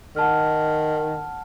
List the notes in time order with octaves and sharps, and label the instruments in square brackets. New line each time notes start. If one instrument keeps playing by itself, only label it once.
[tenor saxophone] D#3 [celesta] F#5 A5 F6